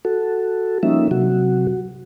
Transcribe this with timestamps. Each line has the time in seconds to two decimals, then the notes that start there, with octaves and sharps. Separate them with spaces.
0.05 F#4 A4
0.83 F3 G3 A#3 C#4 D#4 E5
1.11 C3 F#3 F#4